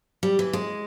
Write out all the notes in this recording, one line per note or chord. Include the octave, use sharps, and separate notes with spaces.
G3
E3
G#3